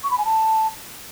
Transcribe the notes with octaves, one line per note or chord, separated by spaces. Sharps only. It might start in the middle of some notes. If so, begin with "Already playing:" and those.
C#6
B5
G#5
A5